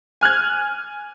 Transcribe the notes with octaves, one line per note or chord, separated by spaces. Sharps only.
G#5 F6 F#6 G#6